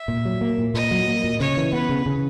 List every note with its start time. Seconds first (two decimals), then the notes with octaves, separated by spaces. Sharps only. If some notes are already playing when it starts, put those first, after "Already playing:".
Already playing: E5
0.08 A#2
0.25 F#3
0.41 A#3
0.58 A#2
0.74 A#2 D#5
0.91 F#3
1.08 A#3
1.24 A#2
1.40 C#3 C#5
1.57 E3
1.73 B3 B4
1.89 C#3
2.06 C#3